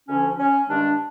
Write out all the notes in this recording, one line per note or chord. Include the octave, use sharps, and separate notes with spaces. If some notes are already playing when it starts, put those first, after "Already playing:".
D2 D3 F3 C#4
C#4
G2 D#3 G#3 D4